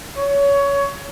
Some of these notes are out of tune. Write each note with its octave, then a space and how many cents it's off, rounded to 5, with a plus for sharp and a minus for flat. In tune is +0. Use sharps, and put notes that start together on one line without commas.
C#5 +20